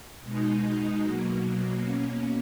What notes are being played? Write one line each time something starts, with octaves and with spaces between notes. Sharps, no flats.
B2 G#3 D#4
B2 F#3 A#3
B2 A#3 C#4